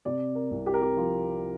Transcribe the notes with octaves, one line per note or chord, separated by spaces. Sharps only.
C3 D5
A#4
C2
G4
A#4
G4
F3 F4